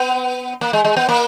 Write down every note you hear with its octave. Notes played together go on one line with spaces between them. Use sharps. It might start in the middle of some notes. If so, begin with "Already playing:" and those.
Already playing: B3
A#3
G#3
G#3
B3
A#3